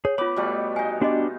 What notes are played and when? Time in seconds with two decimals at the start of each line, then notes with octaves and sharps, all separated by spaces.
0.05 G#4 C#5
0.18 B3 F4 C#5 B5 D6
0.36 B2 G3 A3
0.76 D#4 F5 G#5
1.01 B3 D4 F#4 G4 D#5